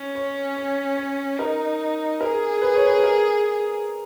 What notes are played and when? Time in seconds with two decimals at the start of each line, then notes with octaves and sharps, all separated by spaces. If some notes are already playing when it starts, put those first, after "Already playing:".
Already playing: C#4 C#5
0.15 C#5
0.56 C#5
0.97 C#5
1.38 D#4 A#4
2.21 G#4 A#4
2.62 B4
2.75 C#5
2.86 B4
3.04 A#4